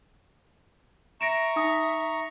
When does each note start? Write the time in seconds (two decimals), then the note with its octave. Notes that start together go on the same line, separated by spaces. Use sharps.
1.21 E5 A#5 C#6 A#6 D7 E7
1.56 D#4 D#6